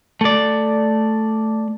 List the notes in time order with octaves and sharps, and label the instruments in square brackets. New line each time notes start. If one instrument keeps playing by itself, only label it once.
[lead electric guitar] A3 D5